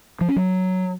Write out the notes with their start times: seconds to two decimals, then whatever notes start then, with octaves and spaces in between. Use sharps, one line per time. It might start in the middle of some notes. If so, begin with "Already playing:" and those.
0.21 F3
0.29 C#4
0.36 F#3